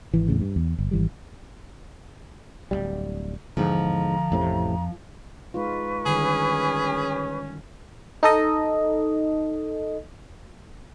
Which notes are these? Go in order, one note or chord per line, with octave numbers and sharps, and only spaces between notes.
G#1 E3
E2 A2 C#3
G2
E2
G1
G#1 E3 G3
D1 D#2 G3
E2 G#2 D3 F3 A#5
A1 F2 A2 C3
G#3 D#4 F4 B4 C#6
D3 D#3 G3 C#4 G#4
D#4 A4 D#5